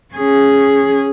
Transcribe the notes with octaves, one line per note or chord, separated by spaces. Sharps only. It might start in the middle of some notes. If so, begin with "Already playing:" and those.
C#4 G#4